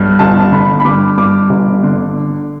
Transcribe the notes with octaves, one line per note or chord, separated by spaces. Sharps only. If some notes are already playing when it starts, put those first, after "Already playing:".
Already playing: B1 G2
G1 A5
D3 B5
B5
G2 D6
G2 D6
G1
D3